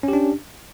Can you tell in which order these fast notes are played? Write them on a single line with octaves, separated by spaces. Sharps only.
C#4 G4 D4